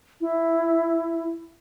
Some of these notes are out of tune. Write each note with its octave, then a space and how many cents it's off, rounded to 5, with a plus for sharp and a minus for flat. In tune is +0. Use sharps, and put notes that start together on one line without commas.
E4 +5